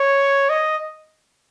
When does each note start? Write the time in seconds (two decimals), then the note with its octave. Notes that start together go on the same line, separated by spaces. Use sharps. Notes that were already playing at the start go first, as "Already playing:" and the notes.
Already playing: C#5
0.50 D#5